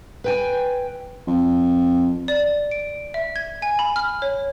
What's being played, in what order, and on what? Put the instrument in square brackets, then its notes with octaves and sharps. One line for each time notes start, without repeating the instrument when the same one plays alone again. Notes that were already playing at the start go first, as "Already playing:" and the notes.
[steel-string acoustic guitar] B4 G5 G#5
[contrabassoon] F2
[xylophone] D5
D7
E5
G#6
G#5
B5
F6
C#5